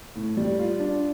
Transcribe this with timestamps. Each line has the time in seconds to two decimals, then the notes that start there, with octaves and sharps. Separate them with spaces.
0.16 A2
0.37 G3
0.59 F4
0.80 D4